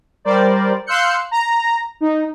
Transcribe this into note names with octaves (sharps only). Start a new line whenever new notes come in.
G3 A#4 C5 D5
F5 C6 E6 F#6 G6 C#7
A#5
D#4